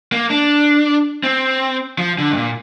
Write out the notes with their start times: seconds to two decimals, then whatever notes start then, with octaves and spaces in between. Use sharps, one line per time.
0.12 A#3
0.30 D4
1.23 C4
1.98 F3
2.18 D3
2.32 G2
2.37 A#2